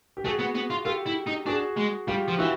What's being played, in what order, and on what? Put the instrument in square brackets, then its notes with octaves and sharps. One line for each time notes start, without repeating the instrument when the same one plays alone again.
[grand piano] G4
[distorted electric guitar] A3 [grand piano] F#4 G#4
[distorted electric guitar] B3
B3
F4
[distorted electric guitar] F4 [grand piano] G4 A4
[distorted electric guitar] E4
D#4
[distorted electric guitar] D4 [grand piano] F#4 G#4
[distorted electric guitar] G#3
[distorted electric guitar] G3 [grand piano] F4 G4
[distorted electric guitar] F3
[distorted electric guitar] E3 [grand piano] E4 F#4